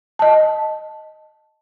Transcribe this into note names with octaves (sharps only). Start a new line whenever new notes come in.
D#5 A5